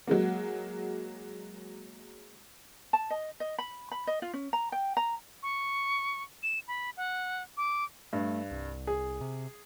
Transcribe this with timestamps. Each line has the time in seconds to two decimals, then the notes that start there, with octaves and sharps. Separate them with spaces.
0.07 F#3 G#3 A#3
2.93 A5
3.10 D#5
3.40 D#5
3.59 B5
3.92 B5
4.07 D#5
4.22 F4
4.34 C#4
4.53 A#5
4.72 G5
4.97 A#5
5.43 C#6
6.43 E7
6.68 B5
6.97 F#5
7.57 D6
8.13 G2 A3
8.51 C2
8.87 G#4
9.21 C3